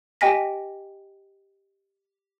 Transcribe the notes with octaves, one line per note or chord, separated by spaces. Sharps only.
G4 D#5 G5 G#5 A#6 B6